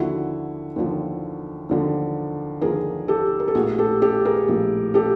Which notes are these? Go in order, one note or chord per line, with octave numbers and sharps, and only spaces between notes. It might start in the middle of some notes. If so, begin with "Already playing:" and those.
Already playing: D#2 D3 F3 E4 F#4
D#2 D3 F3
D#2 D3 F3
D#2 D3 F3 G#4 A#4
G4 A4
A#4
A4
A#1 A2 F3 F#4 G#4
G4 A4
G4 A4
G#4 A#4
A#1 A2 F3
G4 A4